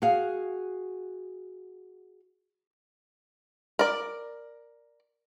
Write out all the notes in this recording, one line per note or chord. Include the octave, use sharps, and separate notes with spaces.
F#4 G#4 F5
A#4 D5